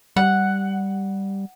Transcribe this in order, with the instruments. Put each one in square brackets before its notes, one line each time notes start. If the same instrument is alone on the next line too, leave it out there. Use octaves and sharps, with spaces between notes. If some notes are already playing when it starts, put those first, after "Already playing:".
[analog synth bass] G3 [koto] F#5